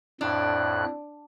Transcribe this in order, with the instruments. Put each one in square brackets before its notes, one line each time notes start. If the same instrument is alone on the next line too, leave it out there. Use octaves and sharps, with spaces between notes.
[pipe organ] F2 A2 F#6 [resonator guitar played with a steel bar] D4